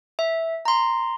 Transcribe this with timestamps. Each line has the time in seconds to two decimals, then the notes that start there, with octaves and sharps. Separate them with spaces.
0.19 E5
0.65 A#5 C6